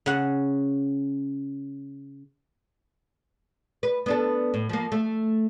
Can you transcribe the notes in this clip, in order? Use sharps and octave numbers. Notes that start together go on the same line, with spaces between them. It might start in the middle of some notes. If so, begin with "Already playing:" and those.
C#3 F#5
B4
B3 D4 A4
A2
F3 A#3
A3